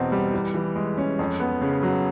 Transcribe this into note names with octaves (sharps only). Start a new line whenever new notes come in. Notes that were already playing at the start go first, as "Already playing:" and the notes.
Already playing: E2 B2 C4
G3
E3
E3
G#3
C#4
F2
B3
C#3
F#3